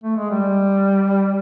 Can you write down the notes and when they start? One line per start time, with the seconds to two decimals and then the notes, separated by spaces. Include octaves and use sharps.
0.04 A3
0.17 G#3
0.31 G3